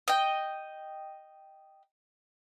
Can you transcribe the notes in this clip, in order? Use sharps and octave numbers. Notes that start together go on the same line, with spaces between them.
D#5 G5